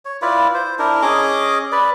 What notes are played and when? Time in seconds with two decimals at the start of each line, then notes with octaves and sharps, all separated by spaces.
0.05 C#5
0.22 E4 F4 B4 D5
0.54 C5
0.79 D4 E4 A#4
1.02 C#4 G#4 D#5 D6
1.72 B4 D5